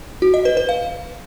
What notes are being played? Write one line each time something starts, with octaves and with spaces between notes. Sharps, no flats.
F#4
D#5
B4
B4
F5